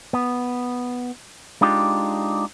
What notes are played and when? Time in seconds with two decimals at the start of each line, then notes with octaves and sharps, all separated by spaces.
0.13 B3
1.61 G#3 D4 D#4 F4 G4